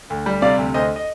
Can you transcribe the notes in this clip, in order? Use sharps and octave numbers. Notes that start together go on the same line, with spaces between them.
D2
G3
C3 D5 F5
D2
D2 C5 D#5
D#5